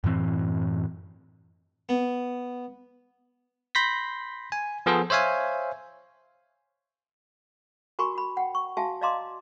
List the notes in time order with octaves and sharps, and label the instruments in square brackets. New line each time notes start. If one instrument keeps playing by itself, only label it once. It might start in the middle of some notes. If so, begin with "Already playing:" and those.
[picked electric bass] F#2 A2 E3 C4
[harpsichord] B3
[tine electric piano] B5 C6 G6 A#6 B6
G#5
F3 B3 G#4 A4 C5
C5 C#5 E5 F5 G#5
[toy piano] F#4 A#4 G#5 B5 C#6
F#4 B5
F#5 G5
C#6
F#4 E5 F5 G#5 A5
D5 D#5 F5 A#5 C6 D6